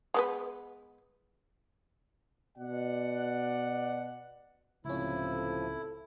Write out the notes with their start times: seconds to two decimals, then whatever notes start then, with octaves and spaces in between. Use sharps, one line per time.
0.14 G#3 B3 B4
2.58 B2 D5 F#5
4.85 C#2 A2 C3 F3 C#4 E4
5.33 A4